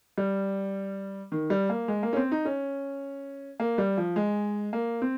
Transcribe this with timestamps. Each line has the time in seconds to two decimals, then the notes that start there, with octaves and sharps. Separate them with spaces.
0.18 G3
1.32 D#3
1.50 G3
1.70 A#3
1.88 G#3
2.03 A#3
2.13 C#4
2.17 C4
2.32 D#4
2.45 C#4
3.60 A#3
3.78 G3
3.98 F3
4.16 G#3
4.73 A#3
5.02 C4